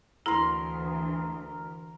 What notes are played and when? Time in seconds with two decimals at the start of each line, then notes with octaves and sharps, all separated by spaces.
0.26 D2 E3 E4 A#4 C6